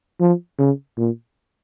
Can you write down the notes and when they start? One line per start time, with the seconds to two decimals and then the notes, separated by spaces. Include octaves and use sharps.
0.21 F3
0.59 C#3
0.98 A#2